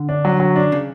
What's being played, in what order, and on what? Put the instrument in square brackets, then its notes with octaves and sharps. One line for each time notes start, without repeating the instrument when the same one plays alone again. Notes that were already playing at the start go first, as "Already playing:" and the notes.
Already playing: [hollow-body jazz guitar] D3
[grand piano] D4
F#3
F#3
D4
[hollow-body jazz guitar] C#3